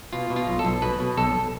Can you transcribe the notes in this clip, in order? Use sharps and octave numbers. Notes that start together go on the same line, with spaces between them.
B2 F4
B2
F4
B1
A4
B1
B2 B4
B2
B1 A4